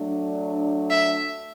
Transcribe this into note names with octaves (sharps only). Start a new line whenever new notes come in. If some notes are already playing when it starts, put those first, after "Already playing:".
Already playing: F#3 A3 D4
E5